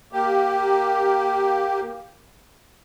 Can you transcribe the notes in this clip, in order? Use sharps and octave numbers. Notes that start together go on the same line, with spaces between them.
A#3 G4